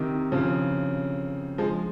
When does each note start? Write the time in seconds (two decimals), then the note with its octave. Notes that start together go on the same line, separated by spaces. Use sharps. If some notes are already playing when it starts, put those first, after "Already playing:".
Already playing: C3 D#3
0.32 C#3 F3
1.58 F3 G#3